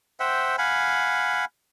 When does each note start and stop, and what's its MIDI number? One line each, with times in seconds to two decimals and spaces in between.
0.20 0.56 72
0.20 0.56 76
0.20 0.56 78
0.20 0.56 79
0.58 1.45 77
0.58 1.45 78
0.58 1.45 80
0.58 1.45 83